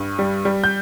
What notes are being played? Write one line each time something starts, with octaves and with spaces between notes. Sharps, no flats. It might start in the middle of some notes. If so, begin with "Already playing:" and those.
Already playing: G2
G3
G3
G6